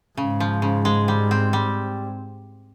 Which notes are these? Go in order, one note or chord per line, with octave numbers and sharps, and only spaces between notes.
G#2 C#3
F3
C#3
G#3
G3
C4
G3